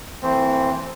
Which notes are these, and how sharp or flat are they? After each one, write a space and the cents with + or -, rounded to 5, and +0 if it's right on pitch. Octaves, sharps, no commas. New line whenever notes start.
E3 +0 A3 +40 C4 +0